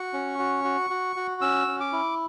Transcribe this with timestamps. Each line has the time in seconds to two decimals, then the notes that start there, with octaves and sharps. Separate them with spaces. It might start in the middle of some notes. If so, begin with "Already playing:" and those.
Already playing: F#4 C#6
0.13 C#4
0.39 F#4
0.64 F#4
0.90 F#4
1.16 F#4
1.41 C#4 E6
1.68 C#4
1.80 D6
1.93 E4